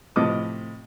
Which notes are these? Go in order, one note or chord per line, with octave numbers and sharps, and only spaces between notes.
A2 C3 F3 D#5 D6 D#6